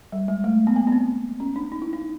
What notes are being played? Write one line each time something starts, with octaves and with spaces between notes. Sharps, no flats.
G3
G#3
A3
B3
A#3
B3
C4
C#4
D4
D#4
E4
D#4